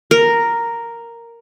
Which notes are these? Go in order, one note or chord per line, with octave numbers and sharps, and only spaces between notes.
A#4